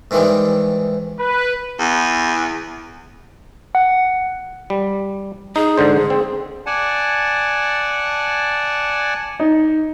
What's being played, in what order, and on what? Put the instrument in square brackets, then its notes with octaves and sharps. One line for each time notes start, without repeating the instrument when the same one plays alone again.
[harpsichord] G#2 D#3 E3 G3 G#3
[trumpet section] B4
[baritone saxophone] E2
[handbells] F#5
[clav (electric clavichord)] G3
[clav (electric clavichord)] D#4 [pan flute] G#4
[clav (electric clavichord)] G#2 D3 C5
C4
[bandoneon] D5 F#5 G#5 A5
[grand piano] D#4